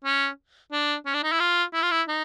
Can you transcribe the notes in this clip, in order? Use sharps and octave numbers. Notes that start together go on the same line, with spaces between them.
C#4
D4
C#4
D4
D#4
E4
F4
E4
F4
E4
D#4